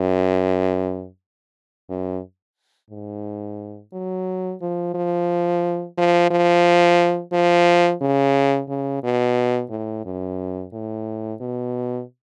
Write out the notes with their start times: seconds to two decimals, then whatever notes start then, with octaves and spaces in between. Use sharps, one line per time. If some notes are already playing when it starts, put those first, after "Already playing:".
Already playing: F#2
1.89 F#2
2.90 G#2
3.93 F#3
4.61 F3
4.95 F3
5.98 F3
6.31 F3
7.33 F3
8.02 C#3
8.69 C#3
9.04 B2
9.70 A2
10.05 F#2
10.73 A2
11.41 B2